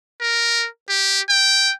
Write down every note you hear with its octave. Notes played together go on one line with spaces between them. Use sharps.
A#4
G4
G5